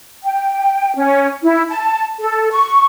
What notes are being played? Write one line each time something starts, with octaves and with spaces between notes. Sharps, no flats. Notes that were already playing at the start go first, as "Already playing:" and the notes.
G5
C#4
E4
A5
A4
C#6